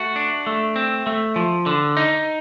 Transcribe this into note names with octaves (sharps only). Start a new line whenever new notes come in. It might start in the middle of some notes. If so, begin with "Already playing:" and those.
Already playing: A3 F#4
D4
A3
C4
A3
F3
D3
D#4